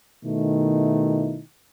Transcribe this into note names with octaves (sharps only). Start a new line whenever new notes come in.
B2 D#3 A3 D#4 E4